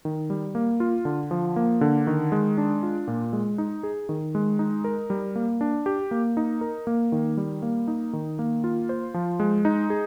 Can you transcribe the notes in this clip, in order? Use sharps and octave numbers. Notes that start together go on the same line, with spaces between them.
D#3
G3
A#3
F4
D3
F3
A#3
D3
D#3
G#3
D4
F4
A#2
G#3
D#4
G#4
D#3
G#3
D#4
A#4
G3
A#3
D4
G4
A#3
D#4
A#4
A#3
D#3
G3
A#3
D#4
D#3
A#3
F4
C5
F3
G#3
D#4
G#4